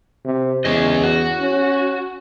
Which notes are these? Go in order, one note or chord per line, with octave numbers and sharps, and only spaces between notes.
C3
E2 C#4 G#4 D#5
F#4
C#4